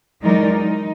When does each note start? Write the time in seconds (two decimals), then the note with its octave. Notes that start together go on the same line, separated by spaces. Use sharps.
0.21 E3 F#3 G#3 D#4 A#4 D5
0.51 D#4